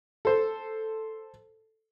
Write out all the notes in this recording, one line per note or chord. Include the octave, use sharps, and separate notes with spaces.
A4 C5